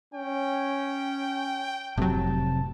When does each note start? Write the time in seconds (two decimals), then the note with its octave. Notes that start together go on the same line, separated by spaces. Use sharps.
0.14 C#4 G5
1.97 F1 A2 C3 F#3 A5